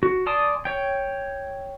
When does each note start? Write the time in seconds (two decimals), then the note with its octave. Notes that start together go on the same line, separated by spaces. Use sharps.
0.03 F#4
0.26 D5 G#5 A5 C6 D#6
0.65 C#5 G5